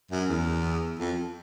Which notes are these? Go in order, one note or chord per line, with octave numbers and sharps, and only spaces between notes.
F#2
E2
F2